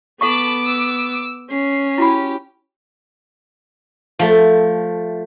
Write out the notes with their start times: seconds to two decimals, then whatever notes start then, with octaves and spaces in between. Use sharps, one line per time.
0.21 B3 A4 F#5 A5 B5 C#6 D6
0.65 E6
1.50 C#4 C7
1.98 E4 F#4 G4 B5
4.19 F3 A3